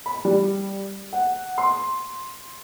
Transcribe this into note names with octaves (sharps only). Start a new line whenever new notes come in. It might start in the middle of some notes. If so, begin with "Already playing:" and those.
B5
G3
F#5
C6